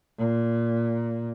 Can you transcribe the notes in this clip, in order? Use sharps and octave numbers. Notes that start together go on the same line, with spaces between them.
A#2